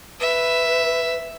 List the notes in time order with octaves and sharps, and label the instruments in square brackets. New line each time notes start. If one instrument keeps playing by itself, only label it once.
[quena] B4 [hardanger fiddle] E5